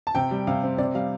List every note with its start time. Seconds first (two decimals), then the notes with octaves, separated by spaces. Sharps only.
0.07 A5
0.15 C3 G5
0.31 G3
0.47 C3 F5
0.63 C4
0.78 C3 D5
0.94 G3 F5